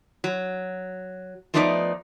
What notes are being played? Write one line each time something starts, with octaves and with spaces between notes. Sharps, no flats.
F#3
F3 A3 B3 D4 D#4 D5